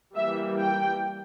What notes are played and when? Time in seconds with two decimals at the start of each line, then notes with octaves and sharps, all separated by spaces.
0.15 E3 G3 A#3 E5
0.59 G5